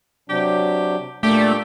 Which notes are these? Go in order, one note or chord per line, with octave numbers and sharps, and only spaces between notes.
C3 F#3 D4 G4
A#2 A3 A#3 D4 G4